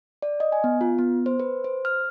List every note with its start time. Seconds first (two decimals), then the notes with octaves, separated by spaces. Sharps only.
0.22 D5
0.40 D#5
0.52 G#5
0.64 B3
0.81 F4
0.98 B3
1.26 C5
1.40 B4
1.64 C5
1.85 F6